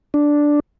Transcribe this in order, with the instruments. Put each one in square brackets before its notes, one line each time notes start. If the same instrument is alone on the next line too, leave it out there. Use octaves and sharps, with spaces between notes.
[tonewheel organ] D4